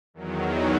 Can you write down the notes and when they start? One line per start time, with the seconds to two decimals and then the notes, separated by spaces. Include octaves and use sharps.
0.14 E2 D#3 F#3